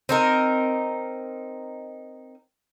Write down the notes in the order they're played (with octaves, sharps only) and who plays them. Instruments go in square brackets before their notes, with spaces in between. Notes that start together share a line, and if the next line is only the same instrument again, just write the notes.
[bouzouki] C4 D#4 A#4